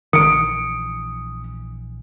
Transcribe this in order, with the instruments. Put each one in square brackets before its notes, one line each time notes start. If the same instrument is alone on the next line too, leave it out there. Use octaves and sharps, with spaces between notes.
[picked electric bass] A#1 E3 [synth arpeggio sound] D#3 [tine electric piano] D#6 [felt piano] C#7 D7